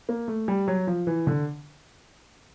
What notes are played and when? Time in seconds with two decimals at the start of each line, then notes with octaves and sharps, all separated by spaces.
0.09 A#3
0.28 A3
0.48 G3
0.68 F#3
0.87 F3
1.07 E3
1.27 D3